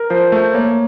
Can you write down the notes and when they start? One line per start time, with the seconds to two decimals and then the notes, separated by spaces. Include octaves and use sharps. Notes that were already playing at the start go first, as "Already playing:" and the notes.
Already playing: A#4
0.10 F3 C5
0.32 A3
0.54 A#3 C#5